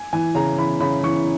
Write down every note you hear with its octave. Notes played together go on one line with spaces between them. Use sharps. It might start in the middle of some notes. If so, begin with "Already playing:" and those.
Already playing: G#5
E3 G#5
C#3 A#5
E3 B5
C#3 B5
E3 C#6